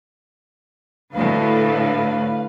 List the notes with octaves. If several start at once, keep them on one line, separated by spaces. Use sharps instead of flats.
D2 A2 B4 F5